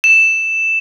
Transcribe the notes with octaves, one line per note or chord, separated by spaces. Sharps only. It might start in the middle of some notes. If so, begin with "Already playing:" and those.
E7